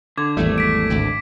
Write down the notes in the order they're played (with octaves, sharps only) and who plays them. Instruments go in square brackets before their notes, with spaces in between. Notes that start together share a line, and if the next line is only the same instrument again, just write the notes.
[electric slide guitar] D3 [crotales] D6 G#6
[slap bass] G#1 E2 G3 [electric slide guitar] A3
[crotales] B6 D7
[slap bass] G#1 D2 A2